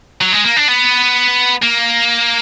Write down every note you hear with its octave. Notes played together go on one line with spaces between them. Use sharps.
F#3
G#3
A#3
D4
B3
A#3